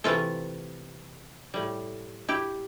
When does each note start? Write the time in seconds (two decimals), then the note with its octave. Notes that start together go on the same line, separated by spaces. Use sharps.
0.04 C3 E3 A3 F4 A4
1.54 A2 G3
2.29 E4 G4